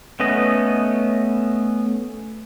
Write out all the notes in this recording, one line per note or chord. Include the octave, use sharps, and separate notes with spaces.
A3 B3 C#4 D#5